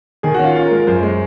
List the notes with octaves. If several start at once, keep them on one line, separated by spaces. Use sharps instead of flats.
D#3 G#4 G#5
C#4 F#4 F#5
F4 F5
C#4 F4 C#5
A#4
G#3
A#4
F#2 C5
G#3